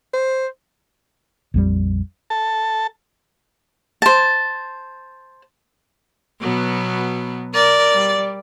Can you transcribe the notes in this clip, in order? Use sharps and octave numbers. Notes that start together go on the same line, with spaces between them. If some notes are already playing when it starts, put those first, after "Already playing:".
C5
A#1 F2 G3
A4 A5
C5 A5
B2 F#3 B3
A#4 D5
G3